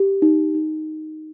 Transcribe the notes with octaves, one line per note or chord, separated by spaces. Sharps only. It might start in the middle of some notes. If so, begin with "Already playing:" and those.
Already playing: G4
D#4
D#4